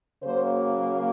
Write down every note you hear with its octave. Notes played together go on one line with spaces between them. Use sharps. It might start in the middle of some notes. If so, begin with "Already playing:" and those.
C#3 F#3 A#3 C5